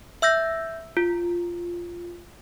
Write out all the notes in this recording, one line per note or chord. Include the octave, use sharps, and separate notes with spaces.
E5 E6 G6 A#6
F4